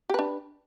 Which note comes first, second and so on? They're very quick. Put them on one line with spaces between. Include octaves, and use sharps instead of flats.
G4 B4 D4